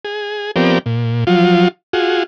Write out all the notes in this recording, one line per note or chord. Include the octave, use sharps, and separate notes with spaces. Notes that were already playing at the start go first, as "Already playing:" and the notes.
G#4
F3 B3 C4 G4 A#4 D5
A#2
F3 F#3 F4
F4 F#4 G#4